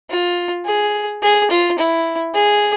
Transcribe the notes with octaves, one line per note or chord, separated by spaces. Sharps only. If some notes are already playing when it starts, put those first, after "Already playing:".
F4
G#4
G#4
F4
E4
G#4